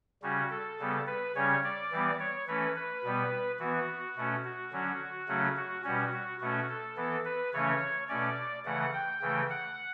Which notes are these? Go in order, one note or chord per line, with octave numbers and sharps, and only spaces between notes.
C#3 G3 C#4 F#4
A4
C#3 G3 B3
B4
C#3 G3 C#4 C#5
D5
E3 G3 B3
C#5
E3 A3 C#4 B4
B4
B2 G3 B3
E3 B3 F#4
B2 A3 C#4
F#4
D3 F#3 C#4
C#3 F#3 A3 C#4
F#4
B2 G3 C#4 F#4
F#4
B2 A3 C#4 F#4
A4
E3 B3
B4
C#3 E3 A3 C#4 C#5
B2 A3 C#4 D5
C#3 E3 A3 F#5
G5
C#3 E3 A3
F#5